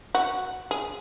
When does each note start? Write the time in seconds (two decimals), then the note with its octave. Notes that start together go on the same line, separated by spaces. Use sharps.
0.15 F#4
0.71 G#4